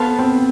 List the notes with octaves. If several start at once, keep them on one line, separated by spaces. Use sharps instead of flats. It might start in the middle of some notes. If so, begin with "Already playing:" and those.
Already playing: B3 A4 C5 F5 A5
C4